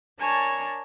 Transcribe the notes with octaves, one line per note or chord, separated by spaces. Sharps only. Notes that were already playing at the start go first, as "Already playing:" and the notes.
D4 A#4 C#5 G#5 A5